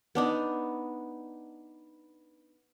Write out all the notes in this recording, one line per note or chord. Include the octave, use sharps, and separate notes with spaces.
B3 D4 D#4